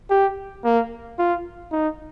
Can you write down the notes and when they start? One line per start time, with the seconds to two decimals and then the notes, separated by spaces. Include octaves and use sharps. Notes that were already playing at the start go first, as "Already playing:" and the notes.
0.10 G4
0.64 A#3
1.19 F4
1.72 D#4